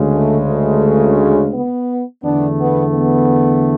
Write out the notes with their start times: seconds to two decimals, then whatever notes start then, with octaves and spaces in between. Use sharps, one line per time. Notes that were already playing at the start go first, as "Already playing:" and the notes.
Already playing: D2 C#3 G#3
0.11 A3
0.46 A3
1.53 B3
2.23 E2 D3 A3 B3 D4
2.59 B3
2.93 B3